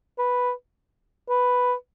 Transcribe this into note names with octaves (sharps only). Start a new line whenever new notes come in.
B4
B4